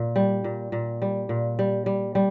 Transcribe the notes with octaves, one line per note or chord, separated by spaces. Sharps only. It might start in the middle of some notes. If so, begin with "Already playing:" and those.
Already playing: A#2
G3
A#2
A#2
G3
A#2
G3
G3
G3